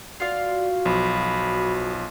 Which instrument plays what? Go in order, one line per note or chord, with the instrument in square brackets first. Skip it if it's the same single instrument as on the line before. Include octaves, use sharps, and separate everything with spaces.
[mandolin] F4 F5 [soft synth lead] F#4 [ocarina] D5
[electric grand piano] B1 F3 [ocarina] B5